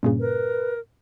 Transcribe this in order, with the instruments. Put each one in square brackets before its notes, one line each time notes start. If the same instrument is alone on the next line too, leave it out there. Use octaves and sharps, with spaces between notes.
[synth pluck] G2 A#2 C#3
[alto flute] A#4 [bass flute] B4